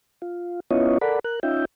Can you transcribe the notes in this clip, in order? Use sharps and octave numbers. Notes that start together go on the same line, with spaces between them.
F4
B3 C#4 E4 F4 C#5 D#5
A4 A#4 D5 F#5 B5
A#4 F#6
C#4 D#4 F4 E5 G5